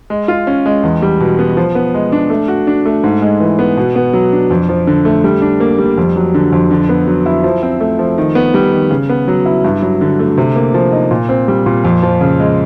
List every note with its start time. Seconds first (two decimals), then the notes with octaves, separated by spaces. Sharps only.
0.10 G#3
0.28 F4
0.47 C#4
0.66 G#3
0.83 E2
1.02 G3
1.20 B2
1.39 B3
1.57 F3
1.75 B3
1.94 G#3
2.12 D4
2.30 A3
2.48 F#4
2.67 D4
2.86 A3
3.03 G#2
3.22 G#3
3.40 E3
3.59 B3
3.77 B2
3.95 B3
4.13 F#3
4.32 D4
4.50 F2
4.69 F3
4.87 D3
5.05 A3
5.24 G3
5.42 D4
5.60 A#3
5.78 G3
5.98 F2
6.16 F#3
6.34 D3
6.52 F2
6.71 D3
6.89 B3
7.07 F#3
7.26 E4
7.44 F3
7.63 C4
7.80 A3
7.99 F3
8.18 D#3
8.35 B3
8.54 G3
8.72 D#3
8.91 C#3
9.09 B3
9.28 F#3
9.46 E4
9.65 G2
9.82 F#3
10.01 D3
10.19 A3
10.38 C3
10.56 A#3
10.74 F3
10.92 D#4
11.11 A#2
11.29 C4
11.48 G3
11.66 A#2
11.84 F2
12.03 F3
12.21 C#3
12.40 G#3